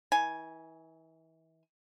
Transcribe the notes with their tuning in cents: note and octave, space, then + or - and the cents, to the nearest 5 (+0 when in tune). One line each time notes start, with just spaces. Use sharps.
E3 -35 G#5 +0